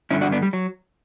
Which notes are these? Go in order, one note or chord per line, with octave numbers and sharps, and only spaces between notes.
G2 D3 C#4 E4
D4 F#4
B3 D4
G3
F#3